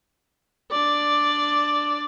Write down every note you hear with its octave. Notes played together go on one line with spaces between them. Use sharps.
D4 D5